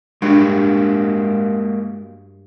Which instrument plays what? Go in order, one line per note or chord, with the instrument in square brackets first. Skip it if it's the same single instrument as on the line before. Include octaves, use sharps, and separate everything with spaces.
[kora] G2 [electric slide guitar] G#3 A#3 F#4